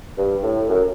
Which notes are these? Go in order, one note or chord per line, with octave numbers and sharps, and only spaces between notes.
G2
A2
F#2